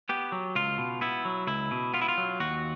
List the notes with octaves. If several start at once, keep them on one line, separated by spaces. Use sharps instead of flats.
B3 G4
F#3
C#2 F4
B2
B3 E4
F#3
C#2 E4
B2
B3 F4
E4
F4
F#3
D#2 F#4